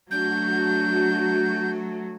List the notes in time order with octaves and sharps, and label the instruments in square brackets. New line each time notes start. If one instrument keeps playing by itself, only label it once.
[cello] F#3 A3 [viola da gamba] D4 [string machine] F#4 [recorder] G6